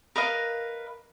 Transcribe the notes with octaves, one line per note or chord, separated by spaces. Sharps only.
A#4 B4 D#5 F5